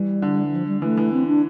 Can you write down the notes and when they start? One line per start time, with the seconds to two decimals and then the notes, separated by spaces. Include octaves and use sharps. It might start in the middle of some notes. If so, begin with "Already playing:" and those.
Already playing: E3 G3
0.22 D3
0.52 F3
0.68 G3
0.82 E3 A3
0.97 E3
1.13 C4
1.27 D4